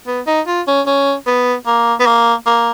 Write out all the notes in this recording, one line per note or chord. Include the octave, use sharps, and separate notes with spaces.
B3
D#4
F4
C#4
C#4
B3
A#3
B3
A#3
A#3